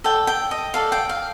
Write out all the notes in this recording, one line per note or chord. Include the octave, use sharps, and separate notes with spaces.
A4 D5 G5
G5
D#5
A4 D5 F5
G5
F5